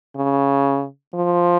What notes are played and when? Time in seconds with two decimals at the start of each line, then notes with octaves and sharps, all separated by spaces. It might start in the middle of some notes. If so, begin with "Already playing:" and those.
0.16 C#3
1.14 F3